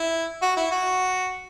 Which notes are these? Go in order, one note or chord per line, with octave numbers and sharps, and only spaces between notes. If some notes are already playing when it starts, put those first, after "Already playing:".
Already playing: E4
F#4
E4
F#4